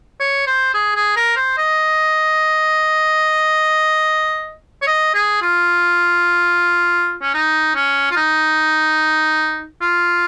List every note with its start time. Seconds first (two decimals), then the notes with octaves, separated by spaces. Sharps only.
0.20 C#5
0.47 C5
0.74 G#4
0.95 G#4
1.17 A#4
1.36 C5
1.58 D#5
4.82 C#5
4.87 D#5
5.14 G#4
5.42 F4
7.22 C#4
7.34 D#4
7.75 C#4
8.11 F4
8.17 D#4
9.82 F4